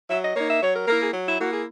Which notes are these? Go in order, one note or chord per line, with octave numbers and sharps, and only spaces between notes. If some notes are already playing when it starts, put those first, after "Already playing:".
F#3 E5
D#5
A#3 D#4 C#5
E5
F#3 C#5
A#4
A#3 E4 A#4
G#4
F#3
E4
A#3 E4 F#4
G#4